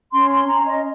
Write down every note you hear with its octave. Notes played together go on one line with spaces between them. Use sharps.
C#4 C6
C6
C#4 A#5
D#5